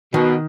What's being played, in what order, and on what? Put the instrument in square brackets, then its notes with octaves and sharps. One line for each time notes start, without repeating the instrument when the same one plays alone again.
[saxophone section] B2 [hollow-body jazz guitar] D#3